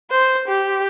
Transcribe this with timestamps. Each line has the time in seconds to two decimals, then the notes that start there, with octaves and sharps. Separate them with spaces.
0.10 C5
0.48 G4